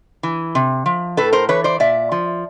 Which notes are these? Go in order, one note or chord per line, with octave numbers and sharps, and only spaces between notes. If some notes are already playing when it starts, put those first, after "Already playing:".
E3
C3
F3
A2 A4 B4
A#4 C5
E3 B4 C#5
C5 D5
A#2 D5 E5
F3